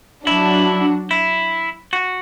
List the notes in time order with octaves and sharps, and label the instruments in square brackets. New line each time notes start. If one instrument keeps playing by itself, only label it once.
[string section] F#3 D4 F#4 [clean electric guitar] E4
[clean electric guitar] E4
F#4